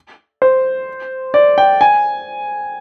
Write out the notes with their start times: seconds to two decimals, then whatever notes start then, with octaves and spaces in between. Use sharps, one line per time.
0.42 C5
1.34 D5
1.58 G5
1.81 G#5